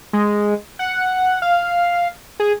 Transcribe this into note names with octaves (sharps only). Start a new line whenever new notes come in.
G#3
F#5
F5
G#4